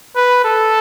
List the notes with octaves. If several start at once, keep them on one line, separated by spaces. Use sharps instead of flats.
B4
A4